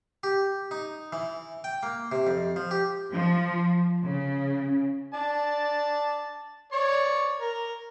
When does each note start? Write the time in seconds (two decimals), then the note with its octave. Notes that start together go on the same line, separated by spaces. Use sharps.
0.23 G4
0.71 D#4
1.13 E3
1.64 G5
1.83 A#3
2.12 C3
2.27 F2
2.56 F3
2.71 G4
3.12 F3
4.06 C#3
5.14 D5 A5
6.73 C#5 D5 C#6
7.41 A#4